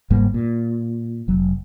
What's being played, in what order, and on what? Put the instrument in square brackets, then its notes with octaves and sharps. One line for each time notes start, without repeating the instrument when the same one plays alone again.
[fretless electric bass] G1 G#2 G3 A#3
A#2
F1 F#3